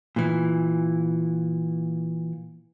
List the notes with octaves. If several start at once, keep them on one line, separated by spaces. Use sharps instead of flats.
A#2 E3